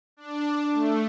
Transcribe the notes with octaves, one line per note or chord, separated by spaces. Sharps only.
D4
A3